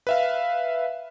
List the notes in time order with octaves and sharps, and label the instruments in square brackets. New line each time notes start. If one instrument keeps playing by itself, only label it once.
[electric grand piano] B4 E5 F5